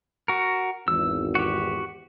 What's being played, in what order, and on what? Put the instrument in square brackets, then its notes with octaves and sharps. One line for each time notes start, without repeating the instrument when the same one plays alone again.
[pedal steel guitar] F#4 A#4
[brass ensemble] G#1 E2 [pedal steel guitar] E6
[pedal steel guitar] F#4 G4